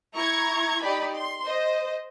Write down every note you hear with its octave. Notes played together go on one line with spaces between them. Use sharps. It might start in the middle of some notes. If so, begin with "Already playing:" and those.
E4 A#5 C#6 G#6
D#4 G4 D5 B5
C6
C5 D#5